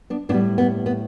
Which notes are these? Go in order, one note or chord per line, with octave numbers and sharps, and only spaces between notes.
B3 D4
A2 G3 B3 D4
B3
B3